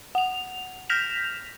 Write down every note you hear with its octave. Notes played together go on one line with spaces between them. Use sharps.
F#5 F7
F6 G6 A#6 B6 E7 F7